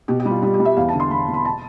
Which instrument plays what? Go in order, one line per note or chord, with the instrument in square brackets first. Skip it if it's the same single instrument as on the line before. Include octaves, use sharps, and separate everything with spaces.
[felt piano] B2 G4
G4
G3
F4
G3 G4
G4
G3
E5
E2 F5
A5
D3
C6
E2 B5
E2
B5
A5